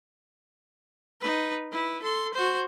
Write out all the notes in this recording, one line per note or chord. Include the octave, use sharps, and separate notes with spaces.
D#4 B4
E4 B4
A4 C6
F#4 C5